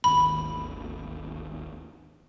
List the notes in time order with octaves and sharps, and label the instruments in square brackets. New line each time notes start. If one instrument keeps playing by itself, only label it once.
[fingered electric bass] D1 G#1 D#2 [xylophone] B5